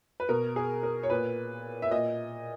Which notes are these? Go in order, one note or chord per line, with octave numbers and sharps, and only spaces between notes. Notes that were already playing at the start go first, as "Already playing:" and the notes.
B4
B2 A#4
G#4
A#4
C#5
A#2 B4
E5
A#2 D#5